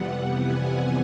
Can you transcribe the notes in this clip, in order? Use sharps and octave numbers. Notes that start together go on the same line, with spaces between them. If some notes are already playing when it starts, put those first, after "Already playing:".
Already playing: F2 C3 E3 G3 B3 F#5
G#5